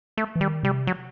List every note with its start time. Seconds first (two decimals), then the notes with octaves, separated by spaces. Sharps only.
0.17 A3
0.36 E3
0.41 D#3 G3
0.63 C3 G3
0.87 F#3